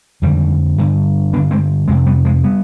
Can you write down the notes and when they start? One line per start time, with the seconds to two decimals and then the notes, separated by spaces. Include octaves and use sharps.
0.22 F2 D3 D#3 G3
0.78 G2 D3
1.33 G2 B3 D4
1.37 D3
1.51 G#3 C4
1.88 F2 C3 G#3 C4
2.06 G3 B3
2.25 F3 G#3
2.44 G3 B3